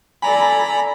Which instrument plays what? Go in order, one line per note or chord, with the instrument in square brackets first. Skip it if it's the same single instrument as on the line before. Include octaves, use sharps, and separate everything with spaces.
[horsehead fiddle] A4 D5 [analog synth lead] G#5 [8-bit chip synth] A#5 B5